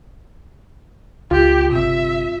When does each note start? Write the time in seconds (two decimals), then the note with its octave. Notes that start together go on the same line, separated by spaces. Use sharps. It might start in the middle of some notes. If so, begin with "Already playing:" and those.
1.31 C#2 F4 G4
1.72 G1 C3 E5